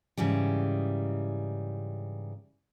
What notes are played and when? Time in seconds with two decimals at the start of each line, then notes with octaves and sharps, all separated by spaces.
0.17 G#2 C#3 E3 G3